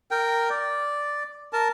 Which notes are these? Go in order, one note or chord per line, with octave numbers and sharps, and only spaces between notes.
A#4 G5
D5
A#4 A5